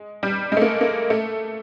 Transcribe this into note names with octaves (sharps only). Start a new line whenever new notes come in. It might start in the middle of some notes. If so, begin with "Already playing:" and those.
Already playing: G#3
G3
G#3 A3
A#3
A#3
A3